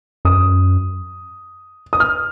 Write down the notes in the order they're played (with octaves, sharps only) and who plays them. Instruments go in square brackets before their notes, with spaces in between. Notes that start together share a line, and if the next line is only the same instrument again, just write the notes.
[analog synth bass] F#2 [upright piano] D#6
[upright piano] D#6
F6